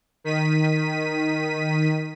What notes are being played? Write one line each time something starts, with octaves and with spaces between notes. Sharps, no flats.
D#3 B6 D#7